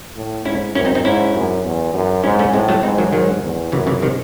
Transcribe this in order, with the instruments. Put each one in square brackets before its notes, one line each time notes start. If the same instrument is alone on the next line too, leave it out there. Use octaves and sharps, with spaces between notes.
[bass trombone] A2
[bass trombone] G#2 [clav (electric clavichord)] C#4 E4
[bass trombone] F#2 [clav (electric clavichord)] C#4 E4
[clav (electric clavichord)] C4 D#4
C4 D#4
[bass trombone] G#2 [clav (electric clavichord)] C#4 E4
[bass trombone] F#2
E2
F#2
[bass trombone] G#2 [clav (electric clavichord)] C#4 E4
[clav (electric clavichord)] A3 C#4
[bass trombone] A2 [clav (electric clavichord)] G#3 C4
[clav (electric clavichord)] F#3 A3
[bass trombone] G#2 [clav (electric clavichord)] C4 D#4
[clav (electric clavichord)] D#3 F#3
[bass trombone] G#2 [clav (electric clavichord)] D#3 F#3
[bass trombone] E2
[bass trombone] F#2 [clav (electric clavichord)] C#3 E3
[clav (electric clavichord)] C#3 E3
C3 D#3